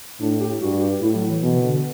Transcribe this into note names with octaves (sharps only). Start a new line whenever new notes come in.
A2 D4
G4
G2 F#4
G4
A2 E4
F#3
E3
B2 E3
C3
D3